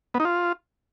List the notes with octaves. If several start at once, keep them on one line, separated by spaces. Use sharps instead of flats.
B3
D#4
F4